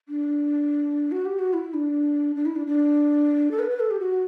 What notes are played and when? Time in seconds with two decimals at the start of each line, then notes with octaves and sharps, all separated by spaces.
0.08 D4
1.12 F#4
1.26 G4
1.39 F#4
1.54 E4
1.74 D4
2.36 D4
2.46 E4
2.56 D4
2.67 D4
3.51 A4
3.59 B4
3.70 B4
3.80 A4
3.91 G4
4.00 F#4